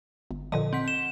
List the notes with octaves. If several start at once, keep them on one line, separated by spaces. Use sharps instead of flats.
G1
A#2 D3 F3 D#5
C4 F#5 B6
E7 G7